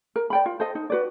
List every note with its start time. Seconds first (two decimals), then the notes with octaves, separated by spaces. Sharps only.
0.16 A#4
0.30 D5 G5 B5
0.46 F4
0.60 A4 C5 D#5
0.75 D#4
0.90 F#4 B4 D5